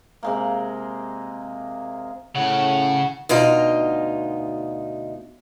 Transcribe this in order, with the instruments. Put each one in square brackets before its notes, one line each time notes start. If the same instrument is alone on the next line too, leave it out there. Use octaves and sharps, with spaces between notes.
[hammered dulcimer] C3 G#3 A#3
[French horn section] A2 [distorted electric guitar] C#3 [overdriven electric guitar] F#5
[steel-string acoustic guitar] D2 B2 D#4 F4